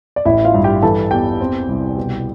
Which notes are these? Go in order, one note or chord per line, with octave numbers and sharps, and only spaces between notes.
D5
A1 E4 E5
F4 F5
G2
G4 G5
E3 A4 A5
E2 G4 G5
C4
C2
B2